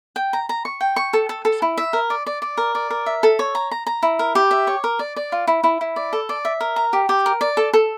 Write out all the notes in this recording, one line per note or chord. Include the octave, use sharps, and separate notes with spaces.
G5
A#5
A#5
C#6
G5
C#6
A4
A4
A4
E4
E5
A#4
D5
D5
D5
A#4
D5
A#4
E5
A4
C#5
A#5
A#5
A#5
E4
A#4
G4
E5
C#5
A#4
D5
D5
F4
E4
E4
E4
D5
A4
D5
E5
A#4
A#5
G4
G4
A#4
D5
A4
A4